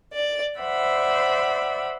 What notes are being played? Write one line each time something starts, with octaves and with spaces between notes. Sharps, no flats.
D5
C5 D5 E5 F#5 B5